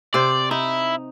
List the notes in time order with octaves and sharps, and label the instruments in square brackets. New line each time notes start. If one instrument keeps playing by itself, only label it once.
[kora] C3 C5 [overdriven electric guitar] D5
[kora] D#4 [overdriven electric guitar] E4